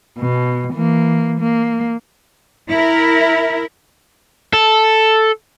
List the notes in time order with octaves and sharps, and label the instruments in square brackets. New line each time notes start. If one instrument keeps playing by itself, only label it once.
[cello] B2
E3 A#3
A#3
[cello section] E4 A#4
[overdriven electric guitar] A4